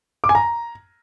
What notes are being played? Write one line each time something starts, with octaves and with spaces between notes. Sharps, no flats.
D6
G#5
A#5